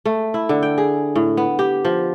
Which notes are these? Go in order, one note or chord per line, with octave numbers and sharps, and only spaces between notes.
A3
E4
D3
G5
G#4
A2
B3
G4
F3